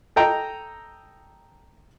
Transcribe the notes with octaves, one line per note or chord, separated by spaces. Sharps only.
A4 D#5 G5 A#5